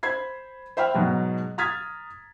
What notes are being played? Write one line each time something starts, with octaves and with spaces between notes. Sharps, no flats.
C5 B5 G#6 C7
C5 E5 G5 B5 F6
G#2 B2 F#3
A#5 D#6 F6 G#6 A6 B6